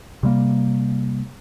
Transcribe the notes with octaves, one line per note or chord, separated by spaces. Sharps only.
C3 G3 A#3